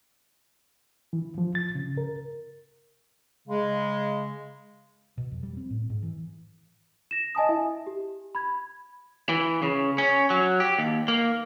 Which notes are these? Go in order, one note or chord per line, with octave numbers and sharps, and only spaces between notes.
E3
F3
A6
C#3
A#4
C#3 G#3
B2
F2
G3
C4
A2
G#2
E3
A#6 E7
D#5 G#5 A5 D#6
E4 E5
G4
B5 G#6
E3
C#3
C#4
F#3
G4
D#2
A#3